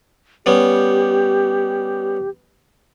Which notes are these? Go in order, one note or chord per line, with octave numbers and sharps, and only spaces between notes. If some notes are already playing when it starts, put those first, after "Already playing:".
G3 B3 C#4 G4